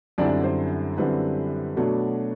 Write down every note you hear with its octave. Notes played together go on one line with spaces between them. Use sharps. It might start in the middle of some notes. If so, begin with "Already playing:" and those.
F#2 D3 G3 C4 D4 E4 D5
C5
F#2 D3 G3 C4 E4 B4
B2 F#3 A3 D4